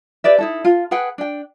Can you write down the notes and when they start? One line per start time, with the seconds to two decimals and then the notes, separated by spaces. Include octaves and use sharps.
0.24 G4 B4 D5 E5
0.39 D#4 E4 A4
0.65 F4
0.91 G#4 B4 F#5 G5
1.18 D4 G5